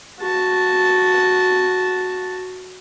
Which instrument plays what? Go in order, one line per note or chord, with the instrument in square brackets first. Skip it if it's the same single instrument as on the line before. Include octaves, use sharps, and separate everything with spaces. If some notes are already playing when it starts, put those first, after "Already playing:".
[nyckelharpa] F#4 A5